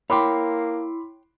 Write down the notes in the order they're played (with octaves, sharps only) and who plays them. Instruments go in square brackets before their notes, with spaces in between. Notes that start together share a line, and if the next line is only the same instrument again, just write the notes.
[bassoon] A#3 [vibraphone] E4 [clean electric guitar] C#5 G5 [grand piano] B5 C6 D6